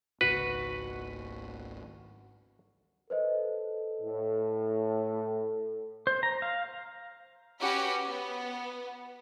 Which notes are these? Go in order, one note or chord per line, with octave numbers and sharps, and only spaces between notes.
G#1 C#2 F#4 B4
A4 B4 C5 D#5
A2
C5
A#5
F5
C#4 F#4 G4 B4
B3